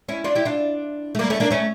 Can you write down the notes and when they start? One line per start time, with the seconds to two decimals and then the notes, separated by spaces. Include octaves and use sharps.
0.08 C#4 E4
0.24 D4 F4
0.35 E4 G4
0.45 D4 F4
1.15 A3
1.19 G3 A#3
1.30 A3 C#4
1.40 A#3 D4
1.51 A3 C#4